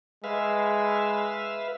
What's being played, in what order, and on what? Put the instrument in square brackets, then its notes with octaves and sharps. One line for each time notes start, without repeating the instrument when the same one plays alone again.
[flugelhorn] G#3 [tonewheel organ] B4 E5 F5